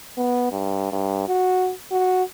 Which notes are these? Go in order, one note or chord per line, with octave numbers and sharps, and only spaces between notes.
B3
G2
G2
F#4
F#4